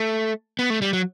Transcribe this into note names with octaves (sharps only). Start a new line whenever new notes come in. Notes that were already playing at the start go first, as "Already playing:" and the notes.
Already playing: A3
B3
A3
G3
F#3